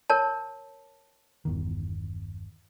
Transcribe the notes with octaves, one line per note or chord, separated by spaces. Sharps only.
A#4 C#5 A5
G1 E2 D#3